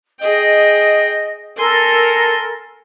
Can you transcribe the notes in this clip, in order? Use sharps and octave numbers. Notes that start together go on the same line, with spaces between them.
G#4 D#5 G5
A4 A#4 G#5 C6